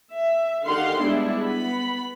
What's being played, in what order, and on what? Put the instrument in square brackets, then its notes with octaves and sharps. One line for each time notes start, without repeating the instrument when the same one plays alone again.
[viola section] E5
D3 D#3 G4 F5 F#5 C6
G3 G#3 B3 D4 E4
B3 B5